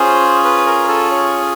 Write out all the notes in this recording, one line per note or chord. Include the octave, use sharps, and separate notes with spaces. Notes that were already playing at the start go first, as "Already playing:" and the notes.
Already playing: C#4 F4 G#4 C5
B4
A#4
A4
C#5